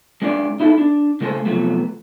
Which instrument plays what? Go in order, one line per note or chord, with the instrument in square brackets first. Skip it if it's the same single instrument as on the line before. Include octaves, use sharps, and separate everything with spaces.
[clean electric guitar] G#3 C#4 D4 E4 D5
D#4 E4 F#4 G4 A4
D4
C#3 G#3 A3 B3 A4 C5
C3 F3 F#3 A3 B3